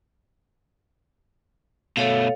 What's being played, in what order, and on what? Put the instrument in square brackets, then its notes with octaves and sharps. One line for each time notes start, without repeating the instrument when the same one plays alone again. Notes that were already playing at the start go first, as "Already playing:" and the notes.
[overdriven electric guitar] B2 A3 [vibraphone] A4 C#5 F5